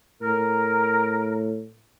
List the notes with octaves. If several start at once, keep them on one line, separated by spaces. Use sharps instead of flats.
A2 A#4